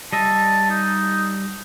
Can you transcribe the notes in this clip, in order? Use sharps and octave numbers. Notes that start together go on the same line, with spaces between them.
G3 D#5 E5 A5
D#4